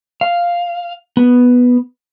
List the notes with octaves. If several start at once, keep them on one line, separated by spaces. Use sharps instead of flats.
F5
B3